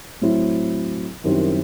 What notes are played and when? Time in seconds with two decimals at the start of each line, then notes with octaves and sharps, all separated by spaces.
0.21 A2 F#3 C4 E4
1.24 F#2 D#3 G3 C4 E4